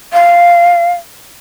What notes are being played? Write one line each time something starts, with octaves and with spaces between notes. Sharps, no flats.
F5